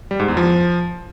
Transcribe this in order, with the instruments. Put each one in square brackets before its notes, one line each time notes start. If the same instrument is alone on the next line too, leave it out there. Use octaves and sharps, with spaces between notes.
[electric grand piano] G3
G#2
E2
F3